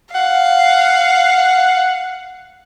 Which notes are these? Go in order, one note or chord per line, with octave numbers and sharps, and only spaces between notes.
F5 F#5